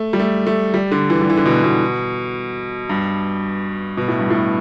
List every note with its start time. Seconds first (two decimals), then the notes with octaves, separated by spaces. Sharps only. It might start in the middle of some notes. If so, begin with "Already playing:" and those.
Already playing: A3
0.13 G3
0.20 A3
0.47 A3
0.74 G3
0.92 D3
1.10 E3
1.21 G3
1.30 E3
1.37 D3
1.45 B2
1.64 B2
2.89 G2
3.97 B2
4.08 A2
4.19 G2
4.30 A2